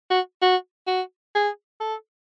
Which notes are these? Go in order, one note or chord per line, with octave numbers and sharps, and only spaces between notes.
F#4
F#4
F#4
G#4
A4